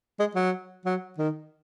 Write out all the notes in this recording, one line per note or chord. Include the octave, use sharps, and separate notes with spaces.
G#3
F#3
F#3
D#3